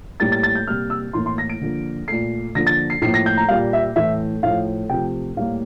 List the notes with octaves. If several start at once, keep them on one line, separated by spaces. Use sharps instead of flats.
A2 G3 A#3 A6
A6
A6
G6
C3 G3 A#3 F6
E6
A2 E3 A#3 C6
C6
A#6
D7
D3 F3 A#3
A#2 A3 C7
D3 F3 A#3 A#6
A6
C7
A2 F3 A#3 C7
A#6
G6
A#5
A#2 G3 A#3 F5
E5
A2 E3 A3 E5
A2 F3 A3 F5
C3 F3 A3 G5
A2 G3 A#3 F5